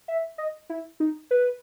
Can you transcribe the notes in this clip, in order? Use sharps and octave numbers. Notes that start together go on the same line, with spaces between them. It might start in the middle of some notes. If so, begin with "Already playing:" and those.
E5
D#5
E4
D#4
B4